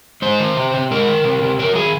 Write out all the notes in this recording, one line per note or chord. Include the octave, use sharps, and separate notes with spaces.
G#3 C5
D#3
C3
C3
G#3 A#4
D#3
C3
C3
F#3 A#4
D#3 G#4